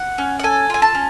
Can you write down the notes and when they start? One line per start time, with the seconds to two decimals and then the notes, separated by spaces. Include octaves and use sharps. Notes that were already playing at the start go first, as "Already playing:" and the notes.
Already playing: F#5
0.18 C#4
0.40 F#5
0.43 A4 G#5
0.70 F4 G#5
0.82 A5
0.95 C#4